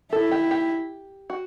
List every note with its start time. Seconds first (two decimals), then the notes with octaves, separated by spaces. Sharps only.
0.12 E4 A4
0.31 G4
0.51 G4
1.30 F#4